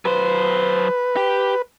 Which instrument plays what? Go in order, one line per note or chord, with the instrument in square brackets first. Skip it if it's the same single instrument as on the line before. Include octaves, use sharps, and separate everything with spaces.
[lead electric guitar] F#3 C5 [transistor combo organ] B4
[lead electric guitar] G4